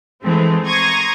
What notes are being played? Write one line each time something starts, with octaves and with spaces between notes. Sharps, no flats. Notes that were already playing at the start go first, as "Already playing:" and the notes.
E3 G#3 A3 C4
A#5 C6 C#6 D#6 G#6 A#6